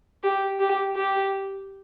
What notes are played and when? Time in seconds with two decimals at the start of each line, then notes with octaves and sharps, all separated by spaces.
0.22 G4
0.60 G4
0.96 G4